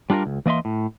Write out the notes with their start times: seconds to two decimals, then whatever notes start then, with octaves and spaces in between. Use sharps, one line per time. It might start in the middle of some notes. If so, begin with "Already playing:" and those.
0.10 G3 D4 F4 G#4 A#4
0.26 C#2
0.46 E3 A#3 D#5 E5 C6
0.65 A2